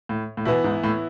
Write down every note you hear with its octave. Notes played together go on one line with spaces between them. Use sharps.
A2
A2
B2 E3 B3 E4
G#2
A2